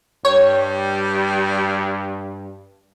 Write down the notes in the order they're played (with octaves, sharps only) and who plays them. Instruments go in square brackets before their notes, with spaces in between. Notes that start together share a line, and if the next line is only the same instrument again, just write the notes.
[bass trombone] G2 [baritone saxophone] G3 [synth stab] C#5